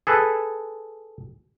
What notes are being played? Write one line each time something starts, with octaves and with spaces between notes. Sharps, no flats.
G#4 A4 B4